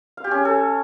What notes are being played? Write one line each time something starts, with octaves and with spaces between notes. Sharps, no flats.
F5
G4
C#4
G#4
A4